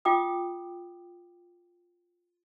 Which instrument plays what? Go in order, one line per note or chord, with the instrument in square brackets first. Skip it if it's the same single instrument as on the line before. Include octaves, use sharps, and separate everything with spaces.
[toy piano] F4 G5 D6 D#6